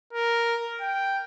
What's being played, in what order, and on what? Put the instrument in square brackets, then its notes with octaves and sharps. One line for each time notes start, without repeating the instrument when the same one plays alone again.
[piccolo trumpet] A#4
G5